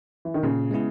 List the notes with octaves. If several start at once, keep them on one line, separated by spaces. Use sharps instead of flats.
E3
D#3
A#2 C#3
G#3 B3 E4 G#4